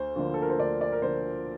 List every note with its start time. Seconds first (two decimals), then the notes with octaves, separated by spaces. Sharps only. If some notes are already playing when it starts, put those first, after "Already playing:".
Already playing: D2 C5
0.16 D3 F3 A#3 D4
0.34 A4
0.42 A#4
0.50 C5
0.59 D2 D5
0.81 D5
0.92 A#4
1.02 D3 F3 A#3 D4 C5